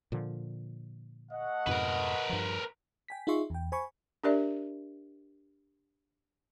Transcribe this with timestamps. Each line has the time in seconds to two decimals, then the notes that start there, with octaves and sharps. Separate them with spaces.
0.12 A#2 D3 F3
1.32 A3 D#5 F#5
1.67 F2 G#2 B2 A#4 B4
2.29 G2 F3
3.08 G5 G#5 B6
3.27 D#4 F4 G#4 E5 C6 C#6
3.50 E2 G5
3.72 C5 G#5 B5 C#6
4.24 D4 G4 A#4 D5 E5